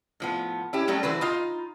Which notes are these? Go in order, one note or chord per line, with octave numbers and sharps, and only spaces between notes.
A2 F3 B3
C#4 E4 G4
F#3 G3 A3 C#4
E3 F#4 B4 C5
D#4 F4